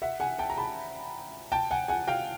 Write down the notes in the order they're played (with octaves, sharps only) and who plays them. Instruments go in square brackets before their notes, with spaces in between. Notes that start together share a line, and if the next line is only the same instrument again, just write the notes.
[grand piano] E5 F#5
F#5 G#5
G5 A5
A#5
A5 B5
G5 A5
F#5 G#5
F#5 G#5
F5 G5